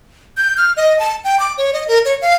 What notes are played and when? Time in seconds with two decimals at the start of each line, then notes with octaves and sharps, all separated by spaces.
0.37 G6
0.57 F6
0.77 D#5
0.99 A5
1.24 G5
1.40 D6
1.58 C#5
1.73 D#5
1.88 A#4
2.05 C#5
2.22 F5